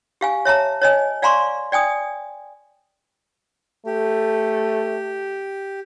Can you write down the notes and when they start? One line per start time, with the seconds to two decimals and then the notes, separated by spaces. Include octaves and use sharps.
0.21 G4 F5 G#5
0.45 C#5 E5 A5 A#5
0.82 C#5 D#5 G#5
1.22 D5 F5 G#5 A#5 C6 C#6
1.72 D5 G5 G#5 D#6
3.86 A3 G4